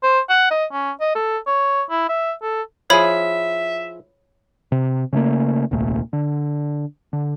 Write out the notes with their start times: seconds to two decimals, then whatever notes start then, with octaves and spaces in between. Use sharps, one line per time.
0.03 C5
0.30 F#5
0.51 D#5
0.72 C#4
1.00 D#5
1.15 A4
1.47 C#5
1.90 E4
2.09 E5
2.42 A4
2.90 F3 E4 G#4 C#5 E5 B5 G#6
4.72 C3
5.13 C#3 A3 A#3
5.71 D#1 C2 A#2 A3
6.13 D3
7.13 D3